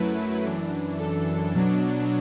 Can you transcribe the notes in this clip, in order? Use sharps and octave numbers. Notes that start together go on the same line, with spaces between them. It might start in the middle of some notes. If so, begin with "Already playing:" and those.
Already playing: F#2 F#3 A3 E4 B4
F#2 E3 D4
A4
B2 F#3 D4